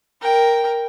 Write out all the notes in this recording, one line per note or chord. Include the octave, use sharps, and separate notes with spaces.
A#4 G5